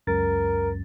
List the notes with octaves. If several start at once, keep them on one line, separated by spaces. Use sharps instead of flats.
C#2 F#2 A#4 A6